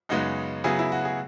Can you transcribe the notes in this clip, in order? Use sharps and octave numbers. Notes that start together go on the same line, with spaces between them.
F#2 C#3 G#3 B3 D#4 F#4
C#3 F#3 B3 E4 G#4
E4
F#4
G#4